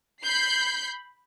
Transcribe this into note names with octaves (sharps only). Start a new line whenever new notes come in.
B5 G6 C7